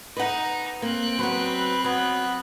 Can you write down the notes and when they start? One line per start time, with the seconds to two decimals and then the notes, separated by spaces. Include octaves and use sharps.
0.17 D#4 B4 F#5
0.82 A#3 C4 F#6
1.19 F#3 B3 B4
1.84 F#3 B3